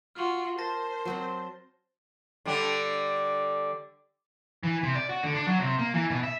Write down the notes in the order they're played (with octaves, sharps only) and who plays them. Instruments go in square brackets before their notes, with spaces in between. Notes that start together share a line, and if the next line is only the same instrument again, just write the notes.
[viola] F4 F#4 [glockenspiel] C6 F6
[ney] A#4 [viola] C5 [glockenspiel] A5 A6 A#6
[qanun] F#3 C4 F#5
[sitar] D3 G3 D4
[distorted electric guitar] E3
C3
D5
F#4
D3
D4
F#3
C3
A#3
E3
B2
E5